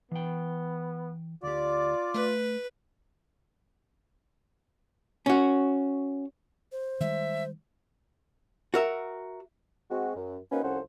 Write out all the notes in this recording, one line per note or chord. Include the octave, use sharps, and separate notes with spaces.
E3 B3 G5
D2 F4 G4 D5
A3 B4
C#4 F#4
C5
D#3 G3 G#3 E5
F#4 A#4 E5
G#3 C4 F#4
F#2
A#3 C4 C#4 D#4 F#4 B4
C2 F3 C#4 A4 C5 F#5